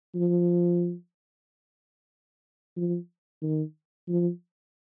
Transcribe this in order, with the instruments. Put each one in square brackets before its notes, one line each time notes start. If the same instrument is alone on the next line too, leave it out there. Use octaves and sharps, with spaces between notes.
[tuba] F3
F3
D#3
F3